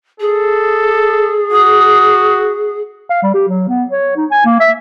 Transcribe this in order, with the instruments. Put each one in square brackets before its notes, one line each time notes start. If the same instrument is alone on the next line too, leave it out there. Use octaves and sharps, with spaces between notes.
[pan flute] G#4 [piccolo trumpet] A4
[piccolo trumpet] F#4 [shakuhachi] D#6
[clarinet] F5
G3
G4
F#3
B3
C#5
D#4
G#5
A#3
E5